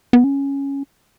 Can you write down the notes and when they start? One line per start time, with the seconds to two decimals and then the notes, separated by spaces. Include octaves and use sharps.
0.13 B3
0.24 C#4